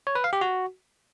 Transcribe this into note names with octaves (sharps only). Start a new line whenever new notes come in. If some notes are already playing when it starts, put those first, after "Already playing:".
C#5
B4
F5
G4
F#4